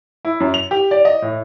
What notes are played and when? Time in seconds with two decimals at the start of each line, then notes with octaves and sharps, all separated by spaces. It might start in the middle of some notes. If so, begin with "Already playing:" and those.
0.25 E4
0.40 F#2
0.54 F7
0.71 G4
0.91 D5
1.05 D#5
1.22 A2